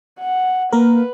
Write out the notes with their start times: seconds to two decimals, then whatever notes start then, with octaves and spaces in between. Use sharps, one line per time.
0.19 F#5
0.72 A#3 A#4 B4